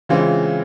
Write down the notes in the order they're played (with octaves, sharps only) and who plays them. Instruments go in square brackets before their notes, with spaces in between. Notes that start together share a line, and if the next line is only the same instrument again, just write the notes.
[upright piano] C#3 E3 G#3 C4 F4